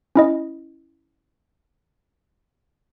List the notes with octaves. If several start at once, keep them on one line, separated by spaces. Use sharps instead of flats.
C#4 E4 D#5